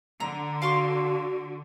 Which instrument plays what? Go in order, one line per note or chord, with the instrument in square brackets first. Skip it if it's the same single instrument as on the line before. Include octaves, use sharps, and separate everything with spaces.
[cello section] D3 [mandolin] A#5
[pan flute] F#4 [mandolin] F5 C6 C#6